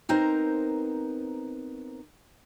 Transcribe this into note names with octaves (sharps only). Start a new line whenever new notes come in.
B3 C4 D#4 A#4 C5 A#5